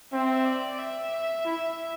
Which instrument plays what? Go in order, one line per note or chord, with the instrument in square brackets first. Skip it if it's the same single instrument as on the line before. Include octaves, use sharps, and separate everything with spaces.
[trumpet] C4 [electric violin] E5
[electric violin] D5
E5
[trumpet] E4